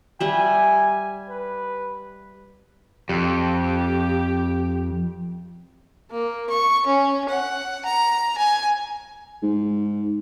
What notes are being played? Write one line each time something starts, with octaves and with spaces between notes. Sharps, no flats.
G3 E5 G#5
B4
F2 G4
A#3
C#6
C#4
F#5
A#5
G#5
G#2